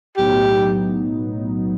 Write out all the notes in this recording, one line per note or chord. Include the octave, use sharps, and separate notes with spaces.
B1 A2 F#3 B3 D#4 G4